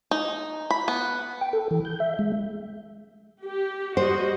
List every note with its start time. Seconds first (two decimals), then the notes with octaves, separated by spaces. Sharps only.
0.11 D#4
0.70 B5
0.88 B3
1.41 G5
1.53 A4
1.71 E3
1.85 G6
2.00 E5
2.19 G#3
3.45 G4
3.97 G3 F#4 C5 D#5